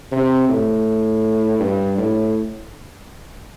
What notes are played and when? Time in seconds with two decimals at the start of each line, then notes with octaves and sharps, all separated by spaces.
0.12 C3
0.49 A2
1.60 G2
1.97 A2